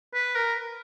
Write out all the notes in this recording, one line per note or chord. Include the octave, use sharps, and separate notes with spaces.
B4
A#4